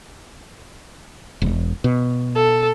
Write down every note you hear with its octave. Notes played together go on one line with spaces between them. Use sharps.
E1
B2
A4